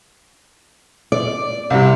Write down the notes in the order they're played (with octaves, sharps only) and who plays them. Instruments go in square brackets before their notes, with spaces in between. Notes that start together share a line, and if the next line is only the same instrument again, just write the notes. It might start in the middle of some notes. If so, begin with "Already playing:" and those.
[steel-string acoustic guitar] D5
[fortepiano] C2 C3